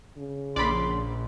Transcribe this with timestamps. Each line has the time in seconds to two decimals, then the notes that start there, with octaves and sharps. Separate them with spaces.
0.18 C#3
0.56 A#1 D5 B5 C6